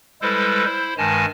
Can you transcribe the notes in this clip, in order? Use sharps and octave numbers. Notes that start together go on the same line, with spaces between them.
G3 G#3 E4 A4 B4 C5
E4 C5
G2 D#3 G#3 G#5 A5